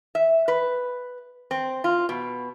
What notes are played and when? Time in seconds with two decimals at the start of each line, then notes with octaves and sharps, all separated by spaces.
0.15 E5
0.48 B4
1.51 C4
1.84 F4
2.09 B2